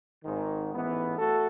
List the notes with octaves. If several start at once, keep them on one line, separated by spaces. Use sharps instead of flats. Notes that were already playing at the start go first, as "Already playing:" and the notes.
G#1 G#2 D#3
A1 G#2 E3 B3
A3 F#4 A4